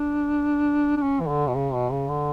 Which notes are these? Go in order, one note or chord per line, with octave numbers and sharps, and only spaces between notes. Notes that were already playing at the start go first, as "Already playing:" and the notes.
Already playing: D4
D4
C#4
E3
D3
B2
C#3
B2
C#3
D3